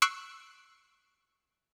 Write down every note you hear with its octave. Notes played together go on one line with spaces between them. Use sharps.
C#6 E6 F#6 C7 D7